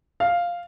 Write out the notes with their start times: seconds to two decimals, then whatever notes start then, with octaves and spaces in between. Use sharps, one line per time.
0.20 F5